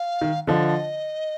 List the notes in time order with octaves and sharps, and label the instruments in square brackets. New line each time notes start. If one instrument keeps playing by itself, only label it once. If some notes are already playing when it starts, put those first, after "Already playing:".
Already playing: [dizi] F5
[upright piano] D#3
[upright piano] D3 F3 [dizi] D#5